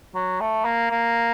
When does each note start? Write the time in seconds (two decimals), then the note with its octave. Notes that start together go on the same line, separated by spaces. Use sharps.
0.15 F#3
0.41 A3
0.65 A#3
0.91 A#3